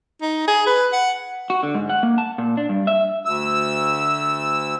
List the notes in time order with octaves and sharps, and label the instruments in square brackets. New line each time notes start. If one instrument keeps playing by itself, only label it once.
[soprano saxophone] D#4
G#4
B4
F#5
[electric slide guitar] F#4
D3
G#2
F#5
A#3
A5
A#2
D4
G2
E5
[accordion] D2 E6